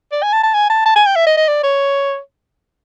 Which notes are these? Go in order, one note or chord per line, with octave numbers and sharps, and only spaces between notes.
D5
G#5
A5
A5
G#5
A5
A5
G#5
G5
E5
D#5
D#5
D5
C#5